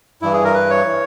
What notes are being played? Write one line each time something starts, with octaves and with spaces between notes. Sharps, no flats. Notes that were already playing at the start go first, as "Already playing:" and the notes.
G2 E3 E4
G#4
A#4
B4
C#5
E3